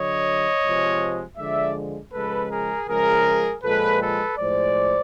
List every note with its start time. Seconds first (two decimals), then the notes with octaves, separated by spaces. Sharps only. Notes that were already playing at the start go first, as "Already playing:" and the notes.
Already playing: D3 F#3 C#5 D#5
0.63 C3 F3 G#3
1.37 D3 F3 G#3 D5 E5
2.13 C#3 F3 G#3 A4 B4
2.50 G#4 A#4
2.88 C#3 F3 G#3 G#4 A#4
3.63 A#2 F3 G#3 A4 B4
4.01 A4 B4
4.38 A2 F3 G#3 C5 D5